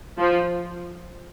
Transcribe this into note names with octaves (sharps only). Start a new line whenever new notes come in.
F3